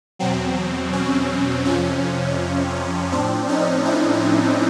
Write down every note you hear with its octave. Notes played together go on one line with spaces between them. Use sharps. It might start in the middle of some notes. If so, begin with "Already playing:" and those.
E2 B2 F#3 C4
C#4
F2 C3 F3 C#4
A2 F3 C4 D4
C#4 D#4
D4 E4